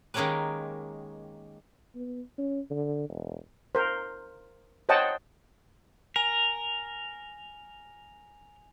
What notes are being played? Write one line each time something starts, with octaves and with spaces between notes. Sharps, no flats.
D#3 G#3 A#3 C#4 G4 B4
B3
C#4
D3
E1
A#4 C5
C5 C#5 D#5 F#5 G5 A5
A#4 G#5 F7